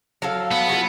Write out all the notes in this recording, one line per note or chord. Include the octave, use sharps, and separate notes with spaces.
F#3 A4 F5
B3
F#3 F4